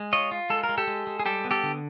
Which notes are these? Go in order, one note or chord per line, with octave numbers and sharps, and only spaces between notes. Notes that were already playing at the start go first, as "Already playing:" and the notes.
Already playing: G#3
F4 C#5 D#5
F4
G#3 A4
A#4
G#3
G4 A4
G#3
G#3
G#4
G3 G4 A4
B3
G4 A4
D3